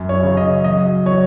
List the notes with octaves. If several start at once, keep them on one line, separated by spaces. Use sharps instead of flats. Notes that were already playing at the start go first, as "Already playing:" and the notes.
Already playing: F#2
C#5
C#3
D#5
F#3 D#5
F#3 C#5